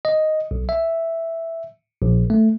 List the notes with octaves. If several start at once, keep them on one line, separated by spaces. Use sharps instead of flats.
D#5
B1
E5
A#1
A3